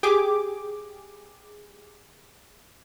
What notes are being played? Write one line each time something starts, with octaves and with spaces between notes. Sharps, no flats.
G4 G#4 D6